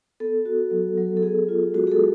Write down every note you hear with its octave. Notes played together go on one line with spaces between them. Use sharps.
B3 A4
F#4
F#3
F#3
A4
B3 G#4
F4
G#3 F#4
G#4
A4
G#3